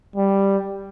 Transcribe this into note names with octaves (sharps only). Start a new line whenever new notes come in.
G3